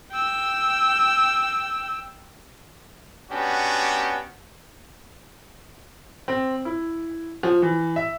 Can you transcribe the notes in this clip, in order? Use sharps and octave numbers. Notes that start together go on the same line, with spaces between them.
G5 E6
B3 C#4 D4 F#4 G4
C4
E4
F3
E3
E5